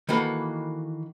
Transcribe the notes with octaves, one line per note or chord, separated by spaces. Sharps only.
D#3 E3 A#3 F#4 A4 B4